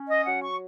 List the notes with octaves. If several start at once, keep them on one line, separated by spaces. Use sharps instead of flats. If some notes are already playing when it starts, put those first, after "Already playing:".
Already playing: C#4
D#5
F#3 F#5
C#6